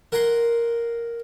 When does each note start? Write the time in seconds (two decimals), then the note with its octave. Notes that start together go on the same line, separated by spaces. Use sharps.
0.12 A#4 F#5 G#5 A#5 C6